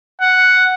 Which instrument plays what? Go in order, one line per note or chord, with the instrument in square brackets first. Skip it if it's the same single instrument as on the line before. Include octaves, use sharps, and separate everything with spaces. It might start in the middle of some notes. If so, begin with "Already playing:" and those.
[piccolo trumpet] F#5